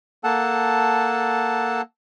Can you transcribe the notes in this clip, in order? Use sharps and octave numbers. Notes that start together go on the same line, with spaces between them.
A#3 A4 F#5 A5